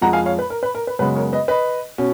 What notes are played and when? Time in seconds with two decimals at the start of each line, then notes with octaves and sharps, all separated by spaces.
0.01 F2 F3 G#3 F#5 A#5
0.13 F5 G#5
0.26 C#5 F5
0.39 B4
0.50 A#4
0.63 B4
0.75 A#4
0.87 B4
0.99 F#2 C#3 G#3 B3 B4
1.15 A#4 C#5
1.33 B4 D#5
1.48 B4 D#5
1.98 B2 C#4